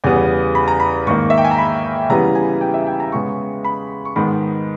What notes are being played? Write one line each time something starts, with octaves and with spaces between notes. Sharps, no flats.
E2 C#3 G3 B3 G#5
B5
A#5
B5
G#2 D#3 A#3 C#6
E5
G5
G#5
A#5
B5
C#3 E3 G3 B3 A#5
G#5
G5
E5
G5
A#5
C#3 G#3 B3 C#6
B5
C#6
G#2 D#3 G#3 B3 B5